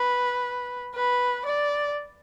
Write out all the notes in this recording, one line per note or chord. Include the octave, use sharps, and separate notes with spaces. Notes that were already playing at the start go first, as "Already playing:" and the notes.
Already playing: B4
B4
D5